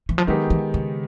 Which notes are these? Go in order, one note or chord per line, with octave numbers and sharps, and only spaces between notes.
E3
F3
D#3 F#3 G#3 B3 D#4 G4
E3
C#3